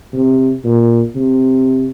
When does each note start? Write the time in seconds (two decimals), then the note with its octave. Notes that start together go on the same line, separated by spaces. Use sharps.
0.13 C3
0.64 A#2
1.16 C3